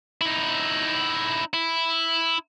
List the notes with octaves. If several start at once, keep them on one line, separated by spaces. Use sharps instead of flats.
D#4 E4
E4